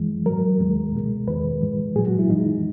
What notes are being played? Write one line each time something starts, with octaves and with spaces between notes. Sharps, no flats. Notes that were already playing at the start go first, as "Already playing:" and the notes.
Already playing: F#2 E3 G#3
G#2 F#3 A#4
D#2 D#3 G#3
C#2 B2 G#3
E2 D#3 G#3 B4
G#2 E3 G#3
A#2 F#3 G#4
F#4
E4
F#2 E3 G#3 D#4